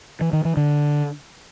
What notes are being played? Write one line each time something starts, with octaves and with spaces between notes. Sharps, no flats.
E3
D#3
E3
D3